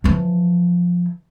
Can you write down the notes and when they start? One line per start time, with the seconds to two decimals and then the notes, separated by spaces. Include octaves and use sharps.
0.04 E3 F3